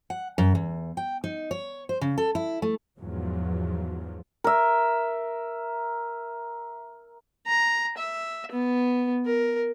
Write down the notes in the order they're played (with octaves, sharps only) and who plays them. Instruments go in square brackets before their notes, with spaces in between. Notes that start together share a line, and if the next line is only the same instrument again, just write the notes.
[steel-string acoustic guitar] F#5
F#2
E2
G5
D#4
C#5
C5
C#3
A4
E4
A3
[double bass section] E2 G#2 F3 F#3
[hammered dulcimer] A#4 E5
[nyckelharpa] A#5
E5
B3
A#4